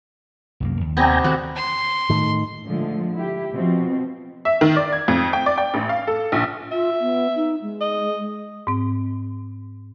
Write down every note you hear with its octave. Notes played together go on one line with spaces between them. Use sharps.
C2 F#2 A#3
D#2
C3 B3 C4 D5 D#5 G5 G#5 A#5
D#3 A3 C4 F#4 F#5
C6
A2 D#3
A#2 D3 F3 G#3 A3
E4 G4
B2 F3 C4
E5
D#3
D5
G#6
F2
G5
D5
G5
A1
F5
A4
A#1
F4 E5
B3
D#4
G#3
D#5
G#2 C4